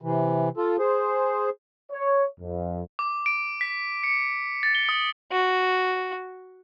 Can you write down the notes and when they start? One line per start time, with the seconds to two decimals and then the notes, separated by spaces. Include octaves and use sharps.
0.02 C3 E3
0.57 F4 A4
0.79 G#4 C5
1.91 C#5
2.40 F2
2.99 D6
3.26 D7
3.61 B6
4.04 C#7
4.63 A6
4.75 G7
4.89 D#6
5.32 F#4